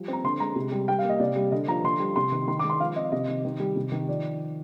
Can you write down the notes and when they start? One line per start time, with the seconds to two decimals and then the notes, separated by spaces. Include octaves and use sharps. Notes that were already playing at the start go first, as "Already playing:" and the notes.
Already playing: F3 G3
0.08 C4 A#5
0.24 D3 C6
0.40 G#3 A#5
0.56 C3
0.72 G3
0.88 G3 G5
0.99 F5
1.04 A#3
1.09 D#5
1.20 C3 D5
1.36 G3
1.52 D3 D#5
1.68 F3 A#5
1.84 D3 C6
2.00 G3
2.16 C3 C6
2.32 D#3
2.48 D#3 C6
2.59 D6
2.64 G#3
2.70 C6
2.80 F3 F5
2.96 C4 D#5
3.12 C3 D#5
3.28 D#3
3.45 D#3
3.60 G3
3.76 C3
3.92 D#3
4.08 F3 D5